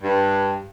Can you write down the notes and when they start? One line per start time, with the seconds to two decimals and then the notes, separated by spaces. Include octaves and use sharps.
0.03 G2